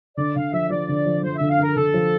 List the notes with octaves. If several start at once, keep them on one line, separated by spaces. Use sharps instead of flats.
D3 D5
D3 F5
F3 E5
F3 D5
D3
F3
F3 C5
D3 E5
F5
D3 A#4
D3 A4
F3